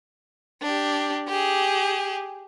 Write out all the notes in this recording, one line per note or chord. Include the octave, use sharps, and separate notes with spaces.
D4 G4
G4 G#4